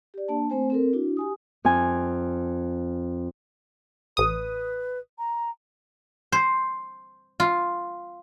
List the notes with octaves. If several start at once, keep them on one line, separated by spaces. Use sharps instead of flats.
G4 D5
A#3 D4 A5
A3 C4 C5 G#5
C4 A4 A#4
D4 E4 F#4
G4 G#5 D#6
F2 G#5
A1 B4 D#6
A#5
C5
F4